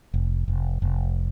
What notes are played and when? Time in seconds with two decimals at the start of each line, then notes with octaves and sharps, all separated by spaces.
0.14 F1
0.48 F1
0.82 F1